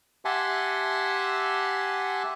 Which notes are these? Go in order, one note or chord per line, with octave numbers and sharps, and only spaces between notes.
G4 E5 F#5 G#5 A5 C6